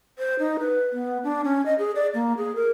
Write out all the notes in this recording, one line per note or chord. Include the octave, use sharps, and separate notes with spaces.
C5
D#4
B4
B3
D4
C#4
D#5
G#4
D5
A#3
G#4
A#4